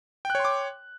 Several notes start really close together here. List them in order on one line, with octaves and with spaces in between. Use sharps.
G5 F#6 C#5 C6 D6